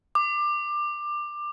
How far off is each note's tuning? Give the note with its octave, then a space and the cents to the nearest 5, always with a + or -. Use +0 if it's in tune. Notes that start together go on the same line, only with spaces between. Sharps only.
D6 +20